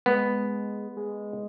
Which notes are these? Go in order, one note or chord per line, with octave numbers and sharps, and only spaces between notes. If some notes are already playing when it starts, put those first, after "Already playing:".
G#3 B3
G#3